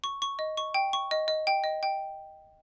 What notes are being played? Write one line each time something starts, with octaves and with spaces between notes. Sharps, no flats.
C#6
C#6
D#5
C#6
G5
C#6
D#5
D#5
G5
D#5
G5